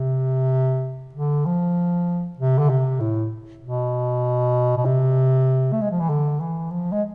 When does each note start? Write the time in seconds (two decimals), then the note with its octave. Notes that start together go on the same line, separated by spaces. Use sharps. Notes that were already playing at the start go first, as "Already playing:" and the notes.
Already playing: C3
1.15 D3
1.46 F3
2.39 C3
2.59 D3
2.70 C3
3.01 A2
3.62 B2
4.77 B2
4.86 C3
5.73 A3
5.82 G#3
5.91 F3
6.00 E3
6.09 D3
6.40 E3
6.71 F3
6.93 G#3